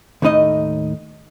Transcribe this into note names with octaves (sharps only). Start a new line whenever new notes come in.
D#2 A2 A3 D#4 D#5